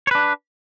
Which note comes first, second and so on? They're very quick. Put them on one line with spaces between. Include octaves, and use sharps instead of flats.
C#5 B4 D4